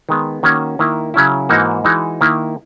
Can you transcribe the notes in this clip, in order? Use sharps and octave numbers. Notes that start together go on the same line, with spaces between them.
D#3 G#3 B3
D#3 A#3 C#4 F#4
D#3 A#3 E4
C#3 F#3 C#4 E4
G#2 E3 A#3 D#4 F#4
E3 G#3 D#4 F#4
D#3 A#3 E4